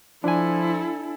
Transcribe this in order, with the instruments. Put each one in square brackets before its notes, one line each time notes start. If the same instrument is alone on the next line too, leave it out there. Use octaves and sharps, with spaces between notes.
[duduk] F3 [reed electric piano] D4 G#5 [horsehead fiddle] E4 A4